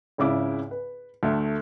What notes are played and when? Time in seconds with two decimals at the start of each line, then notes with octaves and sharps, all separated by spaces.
0.18 G#1 C#2 C#3 E4 D6
0.71 B4
1.23 D2 A3